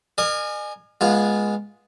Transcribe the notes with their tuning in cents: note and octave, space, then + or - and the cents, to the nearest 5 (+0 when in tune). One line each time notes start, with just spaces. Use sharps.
A#4 +0 D#5 -45 G#5 +0
G#3 +0 B3 -25 F4 +0